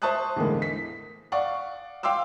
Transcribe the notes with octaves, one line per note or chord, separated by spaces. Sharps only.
C5 E5 A5 C#6 D#6 F#6
E2 A2 D3 G#3 A#3
B6
D5 F5 F#5 C#6
F5 G5 C6 D6 E6